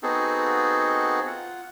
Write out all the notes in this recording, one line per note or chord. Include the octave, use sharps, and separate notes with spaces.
B3 C4 D#4 F#4 G#4 A4
F4 F#5